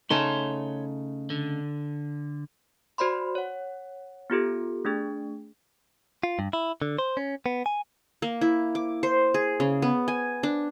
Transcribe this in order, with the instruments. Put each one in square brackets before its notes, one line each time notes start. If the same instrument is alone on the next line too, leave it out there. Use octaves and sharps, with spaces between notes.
[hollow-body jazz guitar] C#3 A3 D#4 [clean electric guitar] C#5 C6
[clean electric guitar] D3
[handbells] F#4 C5 D5 B5 C6
C#5 F#5
B3 F4 G4 A4
A3 D4 G#4
[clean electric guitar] F4
G2
E4
D3
C5
C#4
B3
G#5
[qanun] A#3
E4
D6
C5
G#4
C#3
B3
G#5
D4